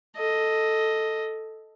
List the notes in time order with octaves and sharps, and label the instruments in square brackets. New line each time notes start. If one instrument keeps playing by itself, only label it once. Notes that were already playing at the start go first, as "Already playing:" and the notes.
[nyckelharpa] A4 D#5